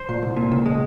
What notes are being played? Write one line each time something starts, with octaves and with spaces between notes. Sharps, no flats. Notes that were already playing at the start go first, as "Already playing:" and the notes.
Already playing: C5
A#2
C2
A#2
C#2
G#3